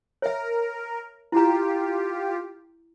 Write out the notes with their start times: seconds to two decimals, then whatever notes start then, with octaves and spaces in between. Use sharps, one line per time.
0.22 A#4 C#5 E5
1.32 E4 F4 G4 A#5